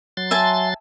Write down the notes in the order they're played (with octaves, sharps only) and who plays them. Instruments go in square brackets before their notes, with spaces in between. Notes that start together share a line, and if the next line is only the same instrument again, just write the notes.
[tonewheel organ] F#3 C6 A6
[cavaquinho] E5 G#5 A5